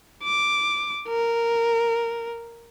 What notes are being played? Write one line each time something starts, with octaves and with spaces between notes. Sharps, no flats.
D6
A#4